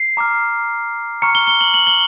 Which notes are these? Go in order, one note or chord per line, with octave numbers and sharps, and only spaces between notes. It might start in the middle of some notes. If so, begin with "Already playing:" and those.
Already playing: C7
A#5 D6 F6
A#5 C#6 F6 C#7
G7
G7
F#7
F#7
G7